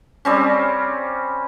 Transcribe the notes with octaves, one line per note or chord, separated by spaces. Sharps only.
G3 C4 C#4